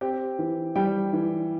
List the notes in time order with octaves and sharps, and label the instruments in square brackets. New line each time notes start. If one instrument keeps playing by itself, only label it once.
[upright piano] C4 G4 G5
E3
G3 G4 G5
E3